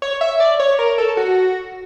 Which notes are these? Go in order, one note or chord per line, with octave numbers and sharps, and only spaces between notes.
C#5
E5
D5
C#5
A#4
A4
F#4